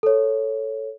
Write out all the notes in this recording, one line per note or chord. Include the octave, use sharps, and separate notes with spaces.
A4 C#5